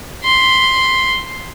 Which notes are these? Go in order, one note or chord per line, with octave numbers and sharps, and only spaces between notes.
B5 C6